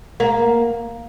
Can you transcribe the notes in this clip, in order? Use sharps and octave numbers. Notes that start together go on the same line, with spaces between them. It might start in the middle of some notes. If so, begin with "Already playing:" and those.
A#3